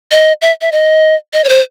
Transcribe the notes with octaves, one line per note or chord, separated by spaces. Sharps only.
D#5
E5
E5
D#5
D#5
C#5
C5